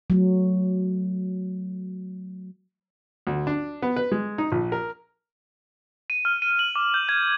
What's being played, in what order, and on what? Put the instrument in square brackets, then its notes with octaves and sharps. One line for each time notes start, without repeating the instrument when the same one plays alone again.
[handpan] F#3 A3
[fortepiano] D2
D4
B3
B4
G#3
D#4
A#1
A#4
[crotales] D#7
F6
D#7
F#7
D6
G6
G#6